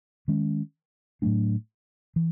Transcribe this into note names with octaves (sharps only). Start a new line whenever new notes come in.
D#3 G#3 C#4
A2 F#3 A3 D4
E3